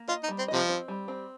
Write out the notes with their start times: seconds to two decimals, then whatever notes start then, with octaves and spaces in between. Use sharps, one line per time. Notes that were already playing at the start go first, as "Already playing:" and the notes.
Already playing: A#3
0.08 F4 D#5
0.23 D#4
0.28 G3
0.38 C4
0.48 C3 F3 D#5
0.69 C4
0.88 G3
1.08 C4